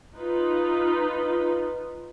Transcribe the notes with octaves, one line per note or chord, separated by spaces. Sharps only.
D#4 F4 B4